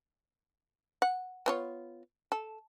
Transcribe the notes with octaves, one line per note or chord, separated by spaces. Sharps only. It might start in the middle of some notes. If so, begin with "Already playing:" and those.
F#5
B3 F4 C#5
A4